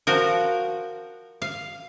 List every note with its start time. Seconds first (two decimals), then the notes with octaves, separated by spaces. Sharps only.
0.07 F3 F#4 A#4
1.42 F5